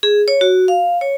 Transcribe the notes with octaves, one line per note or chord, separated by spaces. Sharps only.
G#4
C#5
F#4
F5
C#5